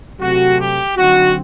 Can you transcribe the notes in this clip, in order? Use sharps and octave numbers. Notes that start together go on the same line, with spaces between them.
C3 F#3 A3 C4 F#4
G4
D3 F#3 C4 D#4 F#4